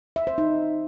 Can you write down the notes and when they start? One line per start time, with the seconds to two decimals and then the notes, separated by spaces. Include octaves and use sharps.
0.16 E5
0.27 C5
0.38 D#4